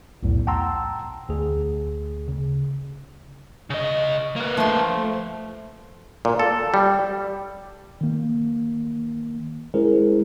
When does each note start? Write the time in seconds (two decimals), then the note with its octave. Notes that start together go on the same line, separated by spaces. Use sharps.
0.23 B1 E2 A2
0.47 F#5 G5 A5 A#5 C6 E6
1.29 D2 G#4
2.28 C#3
3.70 C#3 D#5
4.36 A#3 B4
4.57 F3 A3 C6
6.25 A#2
6.39 A4
6.74 G3
8.01 D#3 A#3
9.74 G#3 C#4 E4 G#4 A#4 C5